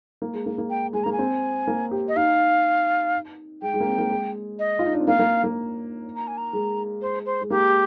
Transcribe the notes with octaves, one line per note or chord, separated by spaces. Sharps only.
A#3
G#3
A#3
A#3
G5
G#3 G#5
A#3 A#5
G#5
C4
A#3
G4
D#5
D#4 F5
G#3 G5
G#3
A#3
C4
A#3
G#3
D#5
F4
D#4
D4
C4
A#3 F5
A#3
A#3
A#5
G#5
A#5
G#3
C5
C5
G#3
A#3 G4